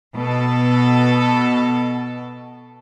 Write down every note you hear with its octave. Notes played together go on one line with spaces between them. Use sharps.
B2 A4